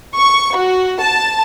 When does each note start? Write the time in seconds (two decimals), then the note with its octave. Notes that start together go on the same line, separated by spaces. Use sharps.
0.15 C#6
0.55 F#4
1.01 A5